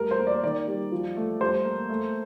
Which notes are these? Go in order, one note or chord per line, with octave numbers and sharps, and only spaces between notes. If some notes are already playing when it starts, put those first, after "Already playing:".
Already playing: G3 A3 A#4
C5
A#3
D5
D#3 D5
G3
F3
A3
G3 C5
A#3
A3